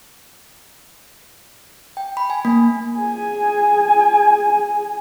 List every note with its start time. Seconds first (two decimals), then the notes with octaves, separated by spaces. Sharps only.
1.97 G5
2.17 B5
2.30 G#5
2.45 A#3
2.96 G#4 G#5